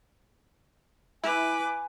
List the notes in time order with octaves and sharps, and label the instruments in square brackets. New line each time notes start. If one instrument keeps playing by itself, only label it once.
[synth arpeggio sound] E4 [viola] B4 D6 [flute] G#5